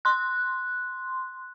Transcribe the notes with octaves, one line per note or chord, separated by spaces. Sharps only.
C6 F#6